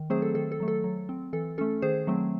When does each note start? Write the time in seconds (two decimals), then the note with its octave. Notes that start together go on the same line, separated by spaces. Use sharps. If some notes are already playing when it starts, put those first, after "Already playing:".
Already playing: D#3
0.10 F#3 A3 C4 G#4 C5
0.22 A4
0.35 D#3 A4
0.52 A4
0.60 F#3 A3
0.68 A4
0.84 F#3
1.09 C4
1.33 E3 A4
1.58 A3 C#4 A4
1.82 D#3 G#4 C5
2.07 F#3 A3 C4